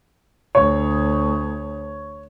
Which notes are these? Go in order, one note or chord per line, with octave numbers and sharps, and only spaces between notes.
D2 C#5